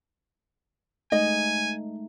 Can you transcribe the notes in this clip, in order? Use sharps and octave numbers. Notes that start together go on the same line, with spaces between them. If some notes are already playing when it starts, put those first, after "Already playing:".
G#3 A3 D#4 D#5 G#5